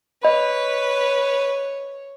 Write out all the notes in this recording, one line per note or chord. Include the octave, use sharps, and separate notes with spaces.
B4 C#5 D#5 B5